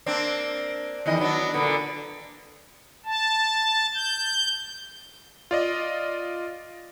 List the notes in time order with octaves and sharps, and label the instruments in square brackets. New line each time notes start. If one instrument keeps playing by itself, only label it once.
[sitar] A#3 C4 D4
E2 D#3 D#5
F#3 B3 D4
A#2 D3 B3
[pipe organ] A5
G6
[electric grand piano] F4 D5 D#5